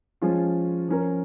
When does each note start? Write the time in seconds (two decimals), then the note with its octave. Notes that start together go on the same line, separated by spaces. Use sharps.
0.22 F3 G#3 C#4 F4
0.88 F3 C#4 A#4